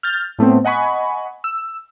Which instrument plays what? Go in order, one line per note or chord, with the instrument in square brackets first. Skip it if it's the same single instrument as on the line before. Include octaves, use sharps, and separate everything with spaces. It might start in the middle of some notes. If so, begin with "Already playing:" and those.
[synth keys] F6 G6 A6
A2 A3 B3 C4
D#5 F#5 G#5 B5 C#6
E6